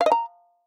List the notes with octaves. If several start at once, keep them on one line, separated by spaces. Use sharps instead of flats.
F5
D#5
A#5